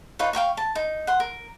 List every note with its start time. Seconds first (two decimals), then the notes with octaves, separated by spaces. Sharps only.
0.19 D#4 F4 B4 C#5
0.33 F5 G5 A#5 C#6
0.57 A5
0.75 D#4
1.07 F#5 C6
1.20 A#4